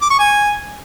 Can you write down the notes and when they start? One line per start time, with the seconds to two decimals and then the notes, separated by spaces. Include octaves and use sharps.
0.02 D6
0.11 C#6
0.19 G#5